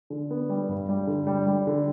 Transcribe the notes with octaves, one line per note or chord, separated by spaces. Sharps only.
D3
B3
G3
G2
G3
D3
G3
G3
D3